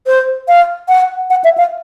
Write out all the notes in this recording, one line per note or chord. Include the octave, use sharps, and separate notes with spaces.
C5
F5
F#5
F#5
E5
F5